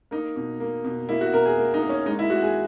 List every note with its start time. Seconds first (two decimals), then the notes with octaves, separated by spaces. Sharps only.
0.11 A#3 D#4
0.36 B2
0.60 A#3
0.84 B2
1.09 A#3 E4
1.21 F#4
1.33 B2 A#4
1.46 G#4
1.58 A#3
1.74 D#4
1.82 A#3
1.89 C#4
2.06 G#3 D#4
2.19 E4
2.30 G#3 F#4
2.43 G#4